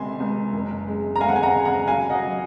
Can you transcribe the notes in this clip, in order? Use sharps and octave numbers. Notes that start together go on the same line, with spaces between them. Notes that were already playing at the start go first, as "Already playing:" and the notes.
Already playing: C#2 C3 G#5 C6
C#2
F#1
G#3
A#5
G#3 F5 G#5
F#5
G#5
F#5 A#5
C#3
F#5 A#5
F#3 F5 G#5
D#5 F#5
F#3